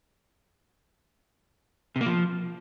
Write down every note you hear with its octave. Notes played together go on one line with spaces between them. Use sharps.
C3
A#3
F3